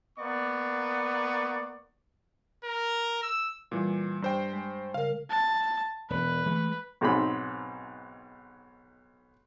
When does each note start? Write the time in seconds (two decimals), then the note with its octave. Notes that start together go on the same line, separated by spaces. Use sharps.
0.18 A#3 B3 D5 C#6
2.65 A#4
3.23 E6
3.72 A#2 E3 G3
4.22 G2 C5 G5
4.53 G#3
4.94 C#3 A#4 F5
5.30 A5
6.10 E1 B4
6.46 E3 G#3 A3
7.01 B1 G#2 C4 B5